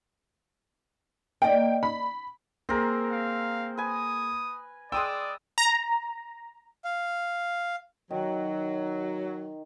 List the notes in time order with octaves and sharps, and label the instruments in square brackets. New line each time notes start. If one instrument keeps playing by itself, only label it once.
[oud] A#3 D5 D#5 [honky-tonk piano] G5
[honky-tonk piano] B5
[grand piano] A#3 G#4 [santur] C4 A#4
[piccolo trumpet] F5
[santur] B4 G#5 [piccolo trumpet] D#6
[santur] G#3 D#6 E6 [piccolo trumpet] D5 [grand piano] G5
[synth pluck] A#5
[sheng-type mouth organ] F5
[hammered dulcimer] D#3 [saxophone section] F#3